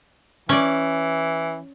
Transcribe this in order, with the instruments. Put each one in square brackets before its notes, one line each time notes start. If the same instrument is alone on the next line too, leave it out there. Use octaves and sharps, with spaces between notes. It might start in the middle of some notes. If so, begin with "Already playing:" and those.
[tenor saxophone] E3 [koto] C#4 D5